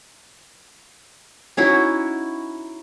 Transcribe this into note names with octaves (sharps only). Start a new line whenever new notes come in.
C#4 D#4 E4 F#4